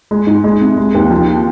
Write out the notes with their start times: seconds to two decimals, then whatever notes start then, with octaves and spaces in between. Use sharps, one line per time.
0.11 G#3
0.27 G#2
0.44 G#3
0.61 C3
0.77 G#3
0.95 D#2
1.11 F3